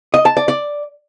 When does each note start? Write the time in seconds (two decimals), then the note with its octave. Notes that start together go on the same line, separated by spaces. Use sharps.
0.14 D#5
0.25 A5
0.37 D5
0.48 D5